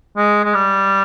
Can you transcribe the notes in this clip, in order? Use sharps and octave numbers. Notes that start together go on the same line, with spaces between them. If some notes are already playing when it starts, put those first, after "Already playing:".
G#3
G#3
G3